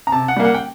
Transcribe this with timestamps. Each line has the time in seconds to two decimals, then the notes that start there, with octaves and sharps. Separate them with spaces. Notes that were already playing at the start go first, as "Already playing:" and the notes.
0.07 A#5
0.12 C3 A5
0.28 F#5
0.37 G3 A#3
0.45 F#5
0.54 G5